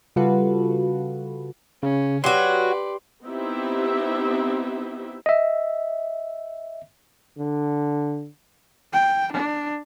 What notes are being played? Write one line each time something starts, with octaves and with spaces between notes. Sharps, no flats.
C#3 G3 F4 F#4 A4 B4
C#3 C#4
F#3 F#4 G4 B4 D5 C6
B3 C4 D#4 E4 G4 E5
D#5 E5
D3
G5
D4